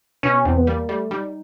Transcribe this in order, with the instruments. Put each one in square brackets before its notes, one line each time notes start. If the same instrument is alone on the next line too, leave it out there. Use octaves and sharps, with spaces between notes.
[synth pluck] B2 [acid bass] C#4
[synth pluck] E2 [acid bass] C4
[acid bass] B3
[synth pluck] G3 [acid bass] A#3
[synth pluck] G3 [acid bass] A3
[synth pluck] G3 [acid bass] D#4